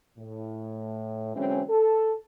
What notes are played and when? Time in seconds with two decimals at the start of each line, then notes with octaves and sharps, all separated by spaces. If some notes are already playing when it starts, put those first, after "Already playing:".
0.18 A2
1.35 D3 E3 F#3 G#3 C4 C#4
1.69 A4